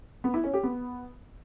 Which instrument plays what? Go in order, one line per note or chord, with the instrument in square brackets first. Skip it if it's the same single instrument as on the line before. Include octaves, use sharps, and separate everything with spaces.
[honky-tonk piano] B3
E4
C#4
G4
B3